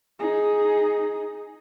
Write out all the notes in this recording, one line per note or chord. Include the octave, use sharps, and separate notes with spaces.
D#4 G#4